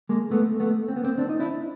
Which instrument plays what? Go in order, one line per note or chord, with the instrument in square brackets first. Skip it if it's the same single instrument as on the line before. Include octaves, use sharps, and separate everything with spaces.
[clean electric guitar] G#3 A#3
A3 B3
A3 B3
C4
B3
A#3 C4
C4 D4
D#4
D4 E4